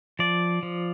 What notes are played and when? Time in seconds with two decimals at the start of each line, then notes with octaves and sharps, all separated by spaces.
0.19 F3 D5
0.63 F3